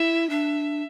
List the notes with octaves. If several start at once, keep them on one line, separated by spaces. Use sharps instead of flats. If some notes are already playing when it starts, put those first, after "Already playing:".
Already playing: E4 E5
D4 E5